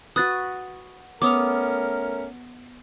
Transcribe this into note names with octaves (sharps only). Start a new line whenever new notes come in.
F#4 B4 D#6 F#6 A6
A3 B3 C#4 A#4 D6 D#6 F7